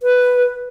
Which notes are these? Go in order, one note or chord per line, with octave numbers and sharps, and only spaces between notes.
B4